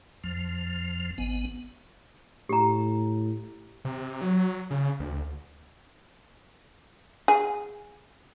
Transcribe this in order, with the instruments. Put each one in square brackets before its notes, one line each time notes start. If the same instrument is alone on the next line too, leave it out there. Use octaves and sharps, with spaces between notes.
[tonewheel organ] F2 F3
G#1 B3
[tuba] A2 [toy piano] G4 A#5
[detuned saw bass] C3
F#3
C#3
D2
[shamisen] G#4